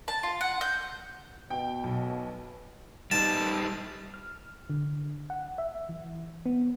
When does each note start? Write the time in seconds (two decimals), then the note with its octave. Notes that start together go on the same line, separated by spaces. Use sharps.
0.08 A5
0.23 F4
0.41 F#5
0.61 G6
1.50 B2 G5
1.84 B1
3.11 G3 D#4 A5
4.14 F6
4.70 D3
5.30 F#5
5.58 E5
5.89 E3
6.46 B3